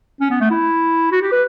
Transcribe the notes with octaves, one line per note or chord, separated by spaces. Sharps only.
C#4
B3
A3
E4
F#4
G4
B4